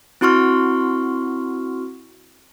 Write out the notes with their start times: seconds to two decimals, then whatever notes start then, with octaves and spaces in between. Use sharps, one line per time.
0.21 C4 E4 F#4 C6 C#6 F6